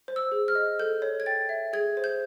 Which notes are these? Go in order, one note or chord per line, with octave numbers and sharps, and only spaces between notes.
C5
E6
G#4
F6
D#5
A4 G6
C#5
G#6
G5 A6
E5
G#4 G#6
C5
G6